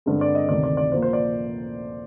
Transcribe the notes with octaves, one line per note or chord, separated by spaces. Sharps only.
G2 D3 G#3 C4
D5
D#5
D2 C3 D#3 D5
D5
D5
A#2 F3 A#3 C5
C5
D5